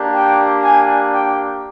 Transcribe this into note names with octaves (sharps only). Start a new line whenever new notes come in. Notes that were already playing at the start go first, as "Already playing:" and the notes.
Already playing: A#3 D4 G4
G5
G#5
G5